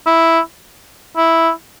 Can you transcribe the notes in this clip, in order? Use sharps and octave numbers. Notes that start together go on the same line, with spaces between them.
E4
E4